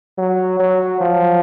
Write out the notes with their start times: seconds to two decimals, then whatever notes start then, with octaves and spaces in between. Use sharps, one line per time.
0.18 F#3
0.60 F#3
1.01 F3